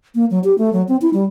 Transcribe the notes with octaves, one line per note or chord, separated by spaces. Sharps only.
A#3
F#3
G4
A3
F#3
C4
E4
G3